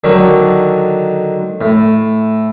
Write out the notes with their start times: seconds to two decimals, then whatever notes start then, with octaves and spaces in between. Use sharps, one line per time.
0.04 D3 D#3 F#3
1.61 A2